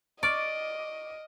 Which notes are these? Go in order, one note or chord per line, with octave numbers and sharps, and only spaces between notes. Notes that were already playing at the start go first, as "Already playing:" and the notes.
D5 D#5 C#6 D6 F6 D7